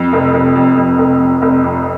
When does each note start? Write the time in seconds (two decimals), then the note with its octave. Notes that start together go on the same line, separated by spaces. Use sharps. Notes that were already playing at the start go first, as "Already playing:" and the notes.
Already playing: F2
0.13 F1
0.34 F1
0.56 F2
0.77 F2
0.98 F1
1.20 F2
1.42 F1
1.63 F2